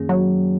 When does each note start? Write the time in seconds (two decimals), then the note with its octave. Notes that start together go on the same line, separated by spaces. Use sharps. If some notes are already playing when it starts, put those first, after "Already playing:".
Already playing: F#2 D#3 A#3 C#4 G#4
0.09 F#3